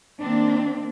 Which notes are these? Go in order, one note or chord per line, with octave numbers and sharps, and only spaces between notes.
D#3 A#3 C4 D4